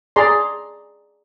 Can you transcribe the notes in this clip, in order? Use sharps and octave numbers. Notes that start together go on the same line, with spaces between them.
G#4 D5 A#5 C6